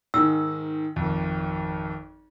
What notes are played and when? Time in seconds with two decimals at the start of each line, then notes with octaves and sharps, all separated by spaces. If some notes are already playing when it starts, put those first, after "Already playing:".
0.14 G#2 D#3 E6
0.96 G#1 F2